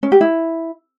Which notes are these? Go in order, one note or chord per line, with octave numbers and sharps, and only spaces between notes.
C#4
G4
E4